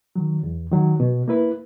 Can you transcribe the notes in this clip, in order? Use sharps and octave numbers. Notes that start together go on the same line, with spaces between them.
D#3 F#3
E2
D#3 F#3
B2
A#3 E4 B4